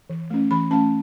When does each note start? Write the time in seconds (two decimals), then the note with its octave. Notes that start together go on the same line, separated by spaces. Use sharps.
0.10 E3
0.30 A3 C#4
0.51 E3 B5
0.71 A3 C#4 A5